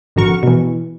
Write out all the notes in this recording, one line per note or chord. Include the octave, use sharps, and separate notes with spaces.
G#1 F2 D3 F#4 A#4 C#6
B2 E3